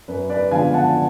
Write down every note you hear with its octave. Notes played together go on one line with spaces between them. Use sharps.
F#2 B4
B4 D5
D3 F3 G#3 B3 F5 G#5
F#5 A5